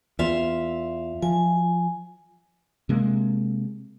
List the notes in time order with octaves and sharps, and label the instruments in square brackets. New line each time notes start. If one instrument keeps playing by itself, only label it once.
[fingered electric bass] E2 [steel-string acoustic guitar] F4 E5
[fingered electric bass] F3 [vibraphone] G#5
[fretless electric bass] C3 G#3 A#3